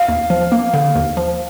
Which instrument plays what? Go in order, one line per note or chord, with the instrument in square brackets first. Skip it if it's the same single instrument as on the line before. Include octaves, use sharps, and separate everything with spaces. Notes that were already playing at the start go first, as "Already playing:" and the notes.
Already playing: [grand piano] F5
[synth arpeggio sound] D#2
F3
A#3
D3
D#2
F3